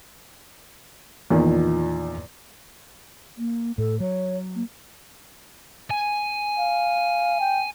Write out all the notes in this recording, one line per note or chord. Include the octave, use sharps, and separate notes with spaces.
E2 A#2 D#3 F3
A#3
A2 A4
F#3 C#5
A#3
G#5
F5
G5